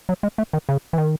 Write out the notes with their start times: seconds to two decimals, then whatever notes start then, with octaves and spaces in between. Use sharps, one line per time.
0.09 F#3
0.23 G#3
0.38 A3
0.53 D#3
0.69 C#3
0.93 E3
0.98 D#3